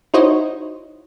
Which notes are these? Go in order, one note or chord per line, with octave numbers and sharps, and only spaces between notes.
D#4 E4 F#4 C5 C#5 D#5